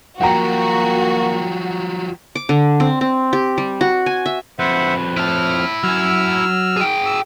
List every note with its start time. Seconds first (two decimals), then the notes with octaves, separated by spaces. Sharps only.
0.21 F3 F#3 A#3 F#4 F#5 G5 A#5
2.35 D6
2.49 D3
2.80 C4
3.01 C4
3.33 G4
3.58 G3
3.81 F#4
4.06 G#5
4.26 E5
4.59 F2 B4 C5 E5 F#5
5.17 E4 A5 F6
5.83 F#3 G#5 E6 F6
6.77 G#4 G5
7.06 E6